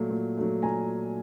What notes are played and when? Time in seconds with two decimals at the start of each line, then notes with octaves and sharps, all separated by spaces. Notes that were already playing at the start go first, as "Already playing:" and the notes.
Already playing: A#2 F#3 A3
0.10 A#2
0.37 F#3 A3
0.62 A#2 G#5 A#5